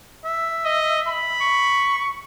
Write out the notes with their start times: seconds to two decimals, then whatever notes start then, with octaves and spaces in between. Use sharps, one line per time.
0.25 E5
0.65 D#5
1.08 B5
1.41 C#6